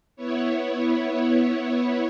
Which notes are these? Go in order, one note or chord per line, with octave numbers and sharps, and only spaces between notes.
B3 E4 C#5